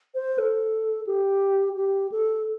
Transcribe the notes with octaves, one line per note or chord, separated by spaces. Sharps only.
C5
A4
G4
G4
A4